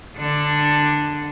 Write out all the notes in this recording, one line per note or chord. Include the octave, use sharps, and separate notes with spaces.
D3 D4